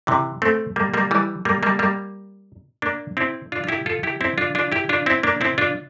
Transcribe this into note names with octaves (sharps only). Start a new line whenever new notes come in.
C3 E3
A3 C4
G3 A#3
G3 A#3
E3 G3
G3 A#3
G3 A#3
G3 A#3
A#3 D4
C4 E4
D4 F4
F4
E4 G4
F4 A4
E4 G4
C4 E4
D4 F4
D4 F4
E4 G4
D4 F4
C4 E4
A#3 D4
C4 E4
D4 F4